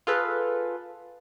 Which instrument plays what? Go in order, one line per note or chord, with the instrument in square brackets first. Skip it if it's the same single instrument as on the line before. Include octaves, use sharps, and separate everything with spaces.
[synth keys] F4 G#4 A4 B4